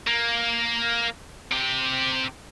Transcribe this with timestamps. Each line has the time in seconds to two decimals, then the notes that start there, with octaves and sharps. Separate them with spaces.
0.07 A#3
1.51 C3 G4